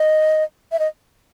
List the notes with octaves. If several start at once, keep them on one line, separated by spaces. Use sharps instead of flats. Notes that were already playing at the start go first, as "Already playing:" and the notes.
Already playing: D#5
E5
D#5